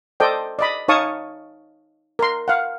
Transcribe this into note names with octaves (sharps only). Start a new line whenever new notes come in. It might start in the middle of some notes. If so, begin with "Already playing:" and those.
A4 C5 D5 D#5 G5
D5 D#5 B5
D#4 C#5 F5 A5 C#6 D#6
A#4 C6
F5 F#5